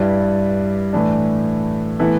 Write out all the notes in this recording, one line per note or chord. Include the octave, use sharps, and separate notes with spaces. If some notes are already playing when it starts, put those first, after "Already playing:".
Already playing: G2 G3 E4 B4 D5
A2 E3 A3 D4
A2 E3 B3 E4 A4